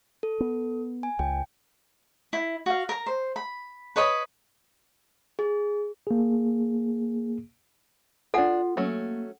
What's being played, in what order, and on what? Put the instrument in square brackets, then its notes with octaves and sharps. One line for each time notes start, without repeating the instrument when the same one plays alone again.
[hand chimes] A4
[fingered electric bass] B3
[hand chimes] G#5
[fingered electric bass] C#2 [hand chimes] G5
[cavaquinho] E4
F#4 F5
A#4 A#5
C5
B5
B4 C#5 D#5 B5
[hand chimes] G#4
[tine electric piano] A#3 G#4
[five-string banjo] D4 G#5 [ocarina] F4 [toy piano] A4 F#5
[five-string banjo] F#3 A3 C#4 [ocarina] A#3